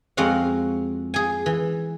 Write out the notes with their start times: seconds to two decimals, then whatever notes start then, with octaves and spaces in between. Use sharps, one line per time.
0.17 F2 G#3 C4 F#4 F5 F#5
1.14 G#4 G#5
1.46 E3